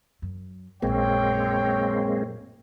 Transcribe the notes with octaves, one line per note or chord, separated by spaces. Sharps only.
F#2
A#1 F#2 G#3 A#3 C4 C#5 G5